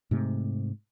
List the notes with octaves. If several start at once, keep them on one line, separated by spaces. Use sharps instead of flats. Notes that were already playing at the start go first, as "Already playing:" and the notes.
G#2 C3 A3